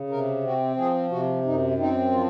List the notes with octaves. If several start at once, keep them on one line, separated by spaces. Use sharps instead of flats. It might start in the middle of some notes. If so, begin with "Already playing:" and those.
Already playing: C#3
C3 A#4
C4 F#4
F3 G#4
C3 F#4
F#2 D#4
C4 D#4
F3 F4